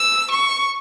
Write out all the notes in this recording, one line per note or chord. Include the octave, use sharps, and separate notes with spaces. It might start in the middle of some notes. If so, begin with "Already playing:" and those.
Already playing: E6
C#6